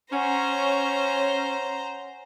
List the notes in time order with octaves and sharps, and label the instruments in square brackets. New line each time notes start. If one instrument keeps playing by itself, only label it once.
[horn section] C#4 [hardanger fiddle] C5 A#5 [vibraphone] C#5 F#5 G#5